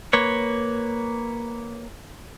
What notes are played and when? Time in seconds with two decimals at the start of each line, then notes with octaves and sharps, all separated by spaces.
0.13 A#3 B4 C#5